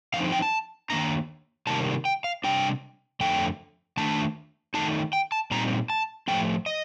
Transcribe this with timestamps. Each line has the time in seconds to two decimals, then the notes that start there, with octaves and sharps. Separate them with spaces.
0.14 D3 F3 C4 D#4 F5
0.32 G5
0.42 A5
0.90 D#3 A#3 D4 A#5
1.67 C3 D#3 G3 A#3 A5
2.05 G5
2.24 F5
2.44 C3 G3 D4 G5
3.20 F2 D3 A3 G5
3.97 D#3 A3 D4 A5
4.74 D#3 A3 D#4 A5
5.13 G5
5.32 A5
5.51 A#2 G3 C4 D#4 A#5
5.90 A5
6.28 A2 F3 A3 C4 G5
6.66 D#5